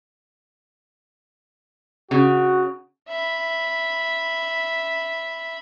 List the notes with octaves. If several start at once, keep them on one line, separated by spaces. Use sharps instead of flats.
C#3 F#4
E5 B5